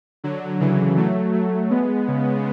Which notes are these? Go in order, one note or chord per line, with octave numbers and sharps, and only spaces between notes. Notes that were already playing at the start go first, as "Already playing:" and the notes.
D3 F#3
C#3 E3
F#3 A3
F#3 A3
G#3 B3
C#3